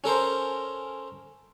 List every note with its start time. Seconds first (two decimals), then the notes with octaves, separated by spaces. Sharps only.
0.04 C#4 A4 A#4 C5